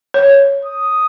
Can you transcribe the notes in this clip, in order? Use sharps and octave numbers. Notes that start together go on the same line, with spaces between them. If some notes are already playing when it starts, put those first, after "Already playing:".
C#5
D#6